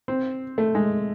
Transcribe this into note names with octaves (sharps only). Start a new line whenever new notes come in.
C4
A3
G#3